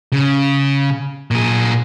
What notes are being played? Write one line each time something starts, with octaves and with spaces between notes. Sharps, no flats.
C#3
A#2 G#4